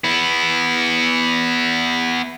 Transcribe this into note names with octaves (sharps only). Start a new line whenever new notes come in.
B3 E4